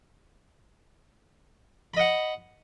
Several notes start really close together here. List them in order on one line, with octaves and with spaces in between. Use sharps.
B5 D#5 F#5